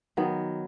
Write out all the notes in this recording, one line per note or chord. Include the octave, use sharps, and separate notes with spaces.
D#3 F#3 B3